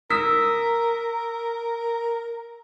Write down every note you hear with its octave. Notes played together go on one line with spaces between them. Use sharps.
A#4 D#6 E6 B6